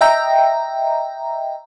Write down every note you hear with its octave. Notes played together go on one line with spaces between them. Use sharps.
D#5 E5 G5 A#5